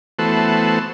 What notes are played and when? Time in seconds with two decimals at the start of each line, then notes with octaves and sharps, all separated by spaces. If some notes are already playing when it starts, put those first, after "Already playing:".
0.19 E3 A3 B3 F#4 A4 C5